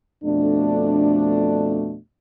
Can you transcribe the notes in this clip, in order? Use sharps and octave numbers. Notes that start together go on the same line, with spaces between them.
F2 B2 A3 D4